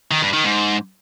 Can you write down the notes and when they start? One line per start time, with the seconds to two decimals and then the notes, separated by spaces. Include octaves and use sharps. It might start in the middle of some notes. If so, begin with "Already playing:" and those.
0.11 D#3
0.22 G2
0.34 D#3
0.45 G#2